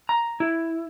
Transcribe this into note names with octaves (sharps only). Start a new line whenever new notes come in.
A#5
E4